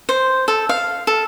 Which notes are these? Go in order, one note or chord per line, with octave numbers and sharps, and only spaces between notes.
C5
A4
F5
A4